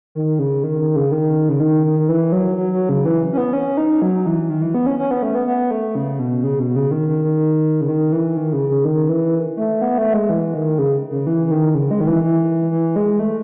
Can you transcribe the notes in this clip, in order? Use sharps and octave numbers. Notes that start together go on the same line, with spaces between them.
D#3
C#3
D#3
D#3
C#3
D#3
C#3
D#3
D#3
D#3
E3
F#3
F#3
F#3
C#3
E3
C#4
B3
C#4
D#4
F#3
E3
D#3
E3
B3
C#4
C#4
B3
A3
B3
B3
A3
C#3
B2
C#3
B2
C#3
D#3
D#3
D#3
C#3
D#3
E3
D#3
C#3
C#3
D#3
E3
A3
B3
A3
G#3
E3
D#3
C#3
C#3
E3
E3
D#3
C#3
G#3
D#3
E3
E3
E3
G#3
A3